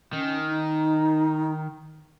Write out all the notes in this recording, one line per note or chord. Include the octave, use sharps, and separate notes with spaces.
D#3 C#4
D#4